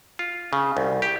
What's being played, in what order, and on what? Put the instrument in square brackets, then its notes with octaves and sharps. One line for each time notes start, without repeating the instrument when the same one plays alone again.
[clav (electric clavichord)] F4
C#3
C2
G4